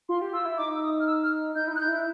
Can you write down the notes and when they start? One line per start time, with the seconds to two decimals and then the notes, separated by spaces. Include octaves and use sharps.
0.09 F4 C6
0.22 G4
0.33 F4 E6
0.45 E4
0.58 D#4 D6
0.76 E6
0.83 D#6
1.00 F6
1.07 E6
1.23 F6
1.55 D#4 G6
1.67 E4
1.72 D#4 F#6
1.80 G6
1.88 E4